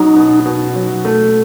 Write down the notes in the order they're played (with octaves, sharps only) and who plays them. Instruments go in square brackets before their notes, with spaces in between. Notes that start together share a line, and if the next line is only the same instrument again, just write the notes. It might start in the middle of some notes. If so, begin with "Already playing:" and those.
Already playing: [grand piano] F#3 C#4 [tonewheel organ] D#4
[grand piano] B2
B2
F#3
A3